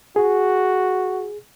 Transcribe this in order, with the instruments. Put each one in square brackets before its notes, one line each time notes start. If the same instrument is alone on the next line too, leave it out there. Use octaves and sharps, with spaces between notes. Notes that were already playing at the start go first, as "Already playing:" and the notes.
[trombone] F#4 [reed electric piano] G#4